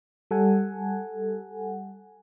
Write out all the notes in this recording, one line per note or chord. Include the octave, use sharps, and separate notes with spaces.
G3 A4 F#5 G#5